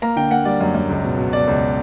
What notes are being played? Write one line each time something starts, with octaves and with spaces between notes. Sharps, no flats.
A#3 A#5
D3 G5
A#3 F#5
G3 D5
F#2
F#2
C#2
B2
B2
B2 D5
C#2